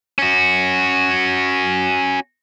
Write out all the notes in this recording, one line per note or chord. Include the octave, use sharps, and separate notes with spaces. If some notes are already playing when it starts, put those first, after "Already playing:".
C#4 F#4